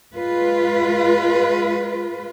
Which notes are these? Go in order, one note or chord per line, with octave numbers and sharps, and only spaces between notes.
G#3 F4 B4